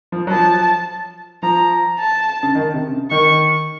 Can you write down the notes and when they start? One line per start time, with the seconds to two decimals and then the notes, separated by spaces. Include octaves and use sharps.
0.12 F3
0.27 F#3
0.31 F3 A5
1.43 F3 A#5
1.99 A5
2.43 C#3
2.55 D#3
2.74 C3
2.92 C#3
3.11 D#3 C#6